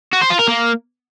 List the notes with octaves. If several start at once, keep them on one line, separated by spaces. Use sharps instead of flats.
F#4
C5
F4
A#4
A#3